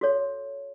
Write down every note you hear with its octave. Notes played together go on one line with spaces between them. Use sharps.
F#4 A4 C#5